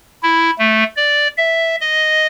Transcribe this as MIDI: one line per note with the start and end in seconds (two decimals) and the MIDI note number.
0.23 0.51 64
0.59 0.84 57
0.97 1.28 74
1.38 1.76 76
1.81 2.27 75